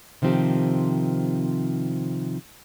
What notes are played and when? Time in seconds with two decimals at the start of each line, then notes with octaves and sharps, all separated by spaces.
0.22 C3 D#3 F3 C4 G4